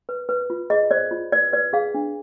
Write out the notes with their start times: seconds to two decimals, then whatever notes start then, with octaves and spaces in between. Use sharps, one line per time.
0.09 B4
0.29 B4
0.50 F4
0.70 G#4 D#5
0.91 C5 D5
1.11 F4
1.32 B4 D5
1.53 B4 D5
1.73 G#4 F5
1.94 D4